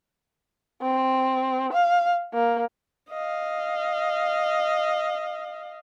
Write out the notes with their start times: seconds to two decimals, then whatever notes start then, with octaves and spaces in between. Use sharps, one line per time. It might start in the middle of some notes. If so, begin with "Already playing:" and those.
0.82 C4
1.72 F5
2.34 A#3
3.10 D#5 F5